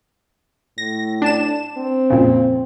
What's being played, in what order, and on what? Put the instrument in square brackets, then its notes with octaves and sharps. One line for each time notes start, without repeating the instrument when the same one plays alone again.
[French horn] A2 [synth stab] A#6
[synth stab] D4 A5 E7
[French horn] C4
[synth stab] F2 A#2 C#3